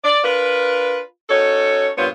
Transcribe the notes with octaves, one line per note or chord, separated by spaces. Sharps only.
D5
D4 F4 A#4 B4
C#4 D#4 F#4 A4 C#5
G2 A#2 B3 F4 C5 C#5